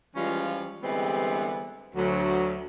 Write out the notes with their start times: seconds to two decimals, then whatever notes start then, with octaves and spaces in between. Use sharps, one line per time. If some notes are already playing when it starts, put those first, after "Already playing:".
0.16 E3 F3 G3 G#3 C#4 F4
0.83 D3 E3 G3 G#3 B3 C4
1.96 D2 F#3